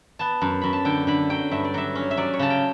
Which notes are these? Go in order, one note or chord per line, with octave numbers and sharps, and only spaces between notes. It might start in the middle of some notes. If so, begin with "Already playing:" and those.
B3 A5
F#2
F#2 B5
A5
D3 G5
D3 B5
F#3 G5
G2 E5
D5
F#3 E5
C#4
E5
F#3 D5
C#5
C#3 A5
G5